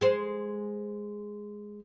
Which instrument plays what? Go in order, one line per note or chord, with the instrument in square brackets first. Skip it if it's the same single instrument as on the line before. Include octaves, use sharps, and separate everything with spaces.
[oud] G#3 C5